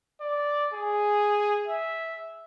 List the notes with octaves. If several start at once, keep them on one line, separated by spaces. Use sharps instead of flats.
D5
G#4
E5